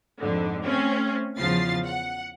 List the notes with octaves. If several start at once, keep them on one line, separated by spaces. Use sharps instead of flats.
F2 G#2 D3
A3 C4 C#4
E2 C#3 F3 F4 A6 C7
F#5